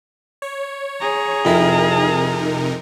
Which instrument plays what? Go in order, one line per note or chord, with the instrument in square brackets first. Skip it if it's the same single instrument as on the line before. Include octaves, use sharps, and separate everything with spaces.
[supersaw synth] C#5
[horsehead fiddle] G#4 A#5
[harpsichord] F2 E4 [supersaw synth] C3 D#4 A#4